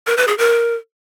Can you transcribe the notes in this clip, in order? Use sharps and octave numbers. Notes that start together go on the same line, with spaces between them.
A#4
B4
G#4
A#4